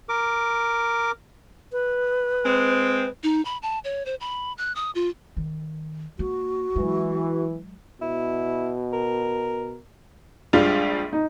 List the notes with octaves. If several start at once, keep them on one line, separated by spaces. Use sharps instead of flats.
A#4 D6
B4
G#3 C4
D#4
B5
A5
C#5
C5
B5
F#6
D#6
F4
D#3
A#3 F#4
E3 F#3 G#3
B2 E4
A#4
A#1 G3 G#3 D4 F4
D#4